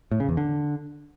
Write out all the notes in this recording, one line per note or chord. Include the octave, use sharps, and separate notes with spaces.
A2
C#3
E2
D3